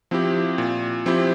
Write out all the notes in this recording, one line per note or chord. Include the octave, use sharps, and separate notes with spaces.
F3 C4 E4 G4
A#2
F3 C4 E4 G4